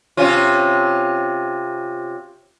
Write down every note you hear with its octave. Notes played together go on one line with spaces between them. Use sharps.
C3 C#4 F4